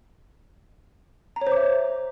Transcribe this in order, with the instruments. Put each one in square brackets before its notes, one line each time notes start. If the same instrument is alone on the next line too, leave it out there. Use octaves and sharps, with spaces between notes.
[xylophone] A#5
C#5
C5
D6
E5